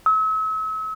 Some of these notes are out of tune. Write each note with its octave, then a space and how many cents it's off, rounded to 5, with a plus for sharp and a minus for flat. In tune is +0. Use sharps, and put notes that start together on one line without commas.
E6 -40